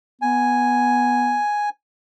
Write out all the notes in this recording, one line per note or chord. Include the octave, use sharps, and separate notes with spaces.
B3 G#5